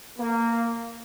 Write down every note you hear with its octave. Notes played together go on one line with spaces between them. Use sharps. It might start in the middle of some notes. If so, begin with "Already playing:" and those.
A#3